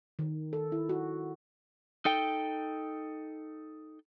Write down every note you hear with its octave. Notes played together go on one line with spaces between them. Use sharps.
D#3
A4
E4
F#4
D#4 A4 G5